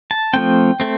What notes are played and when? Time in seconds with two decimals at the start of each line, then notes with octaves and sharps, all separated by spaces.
0.11 A5
0.33 F3 A3 C4 G5
0.80 A3 C4